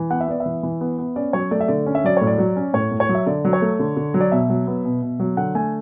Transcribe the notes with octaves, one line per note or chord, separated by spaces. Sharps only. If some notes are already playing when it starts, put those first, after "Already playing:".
Already playing: E3
B3 F#5
E5
B3 D5
E5
E3
E3
B3
B3
C#4 D5
F#3 C#5
A3 D5
E5
D3 D5
C#4
E5
F#3 D5
A2 C#5
D5
F#3
C#4
A2 C#5
A2
C#5
F#3
E5
D3 D5
F#3
C#5
A3
D3
D3
F#3
D5
B2 E5
F#3
B3
B2
B2
F#3
D3 F#5
A3 G#5